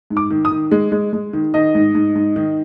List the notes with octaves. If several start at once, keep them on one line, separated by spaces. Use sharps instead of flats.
G#2
D6
D#3
D#6
D#3
G#3
G#3
G#3
D#3
D#3 D#5
G#2
G#2
G#2
D#3